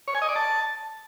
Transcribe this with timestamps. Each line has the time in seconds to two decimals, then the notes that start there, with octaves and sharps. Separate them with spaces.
0.08 C#5
0.15 G#5
0.22 D#5
0.29 D5
0.36 A5